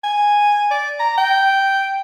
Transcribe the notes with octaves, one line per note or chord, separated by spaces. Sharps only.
G#5
D5
A#5
G5